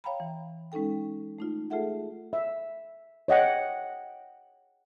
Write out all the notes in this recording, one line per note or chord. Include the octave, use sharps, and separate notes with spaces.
C#5 F5 G5 A#5 B5
E3
G#3 C#4 D#4 A4 G5
A3 D#4 F4
A3 F4 G#4 A4 E5 F#5
E5
C#5 D#5 F#5 G5